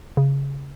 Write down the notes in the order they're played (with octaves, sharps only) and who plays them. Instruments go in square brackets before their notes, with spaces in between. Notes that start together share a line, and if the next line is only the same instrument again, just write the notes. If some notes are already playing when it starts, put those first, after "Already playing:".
[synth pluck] C#3